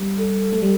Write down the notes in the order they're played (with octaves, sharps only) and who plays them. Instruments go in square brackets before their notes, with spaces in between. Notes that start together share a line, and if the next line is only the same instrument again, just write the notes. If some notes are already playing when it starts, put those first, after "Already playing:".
Already playing: [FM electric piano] G3
[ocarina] A4
[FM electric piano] A3
G3